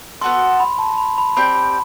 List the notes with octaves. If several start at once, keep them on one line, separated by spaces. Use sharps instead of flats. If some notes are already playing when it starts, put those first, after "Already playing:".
B3 F#4 A4 C6
B5
A5
B5
B5
C4 G4 D5 G5 B5
B5